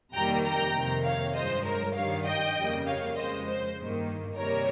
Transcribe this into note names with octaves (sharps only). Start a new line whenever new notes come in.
F2 C3 D#3 G3 A#3 G5 A#5
G5 A#5
F2 C3 D#3 A#3
C#5 F5
G2 F3 G#3 C5 D#5
A#4 C#5
G2 D#3 G3 C#5 F5
D#5 G5
F2 C#3 G3 A#3
C#5 F5
F2 C#3 G#3 C5 D#5
C5
G2 D#3 A#3
C3 G3 A#3 A#4 C#5